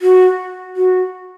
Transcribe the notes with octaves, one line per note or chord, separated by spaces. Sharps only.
F#4
F#4